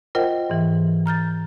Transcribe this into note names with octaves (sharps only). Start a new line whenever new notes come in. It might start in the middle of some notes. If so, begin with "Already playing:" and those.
F4 A#4 C5 D#5 F#5 G5
G#2 E3
A#5 F6 G6 A6